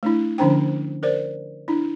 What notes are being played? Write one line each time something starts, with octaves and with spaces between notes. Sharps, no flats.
A3 D4 E4
D3 F3 C#4 D4 C5 G5
A#4 C5 D5
D4 E4